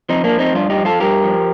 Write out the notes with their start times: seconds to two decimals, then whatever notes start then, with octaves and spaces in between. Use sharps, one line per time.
0.09 F3 C4 D#4
0.24 A#3 D4
0.32 F3
0.39 C4 D#4
0.55 G2 D4 F4
0.70 D#4 G4
0.77 F3
0.85 F4 A4
1.00 G2 G4 A#4
1.24 F3